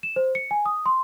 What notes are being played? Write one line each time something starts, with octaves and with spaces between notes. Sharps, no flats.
E7
C5
C#7
G#5
D#6
C6